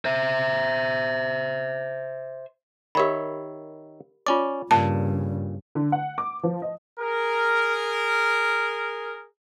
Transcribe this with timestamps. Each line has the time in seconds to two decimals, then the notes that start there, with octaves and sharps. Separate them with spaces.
0.05 C5 E5
2.95 D#3 G4 A#4 C#5 E5 B5
4.27 C#4 F4 D5 D6
4.71 G2 A#2 C#3 A5
5.75 D3
5.92 F#5
6.18 D6
6.43 F3
6.62 D#5
6.99 G#4 A#4